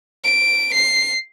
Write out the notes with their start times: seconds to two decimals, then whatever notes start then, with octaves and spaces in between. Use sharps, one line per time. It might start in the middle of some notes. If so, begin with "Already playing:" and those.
0.24 D7
0.74 C7